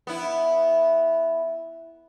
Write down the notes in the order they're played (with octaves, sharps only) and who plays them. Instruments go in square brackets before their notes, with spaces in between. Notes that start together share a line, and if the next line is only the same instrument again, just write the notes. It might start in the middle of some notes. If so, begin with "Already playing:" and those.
[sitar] B3 E4